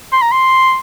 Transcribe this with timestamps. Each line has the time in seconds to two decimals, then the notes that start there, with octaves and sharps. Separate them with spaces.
0.13 C6
0.22 A#5
0.32 C6